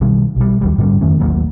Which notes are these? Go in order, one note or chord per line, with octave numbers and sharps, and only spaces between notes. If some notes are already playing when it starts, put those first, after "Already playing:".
B1 D#3 G3
B1 G3
D#2 F#3 G3
G#2 D3 G3 C#4
F2 D#3 A3 C#4
A1 D#2 F#3 A#3